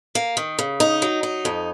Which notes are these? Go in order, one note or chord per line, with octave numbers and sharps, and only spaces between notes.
A#3
D#3
C#3
D#4
F#3
D#4
F2